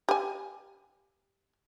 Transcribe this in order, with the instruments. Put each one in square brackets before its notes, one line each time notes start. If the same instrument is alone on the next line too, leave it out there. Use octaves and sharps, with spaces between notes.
[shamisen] G4 G#5